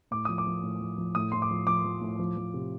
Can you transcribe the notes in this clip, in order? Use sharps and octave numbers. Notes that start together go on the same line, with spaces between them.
A2 D6
F3 D#6
D6
F3
A2
F3
F3
A2 D#6
A2 C6
D6
F3
F3 D6
F3
A2
F3
F3
C3